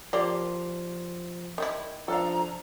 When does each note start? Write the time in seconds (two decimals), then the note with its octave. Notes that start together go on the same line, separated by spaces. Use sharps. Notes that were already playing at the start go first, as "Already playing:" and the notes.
0.13 F3 A#3 G4 D5 C6
1.58 D#3 G3 E4
2.08 F3 D4 A4 F5 A#5